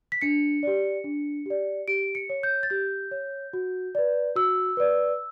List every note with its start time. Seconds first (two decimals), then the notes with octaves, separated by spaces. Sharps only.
0.12 B6
0.21 D4 C#7
0.63 G4 D5
1.04 D4
1.46 G4 D5
1.88 G4 D7
2.15 C#7
2.30 C#5
2.43 G6
2.63 A6
2.70 G4 G6
3.11 C#5
3.53 F#4
3.95 B4 D5
4.36 F#4 E6
4.77 B4 D5